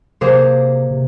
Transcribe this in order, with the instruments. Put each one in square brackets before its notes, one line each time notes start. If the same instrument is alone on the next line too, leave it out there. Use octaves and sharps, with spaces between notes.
[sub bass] C3 [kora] A#3 G#4 C5
[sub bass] C3